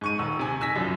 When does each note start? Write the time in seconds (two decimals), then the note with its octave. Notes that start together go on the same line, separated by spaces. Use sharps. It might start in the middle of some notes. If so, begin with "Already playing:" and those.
0.01 G#2 C#6 D#7
0.19 D#1 E6
0.39 C3 G#5
0.61 G#5 E6 A#6 B6
0.75 C2 F#2 F3